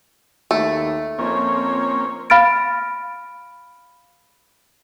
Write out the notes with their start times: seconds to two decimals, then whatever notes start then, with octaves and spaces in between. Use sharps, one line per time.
0.51 D#2 A3
1.19 F2 A#3 C4 C#4 C#5
2.30 F5 B5 F6 A6 D7